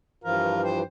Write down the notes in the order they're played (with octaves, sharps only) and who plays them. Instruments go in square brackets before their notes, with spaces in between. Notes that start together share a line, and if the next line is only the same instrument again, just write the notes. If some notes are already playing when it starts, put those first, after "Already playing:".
[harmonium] G2 E3 F3 [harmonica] F4 A#4
[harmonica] C5 G5